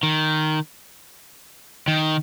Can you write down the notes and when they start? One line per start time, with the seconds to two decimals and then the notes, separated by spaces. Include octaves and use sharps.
0.03 D#3
1.88 D#3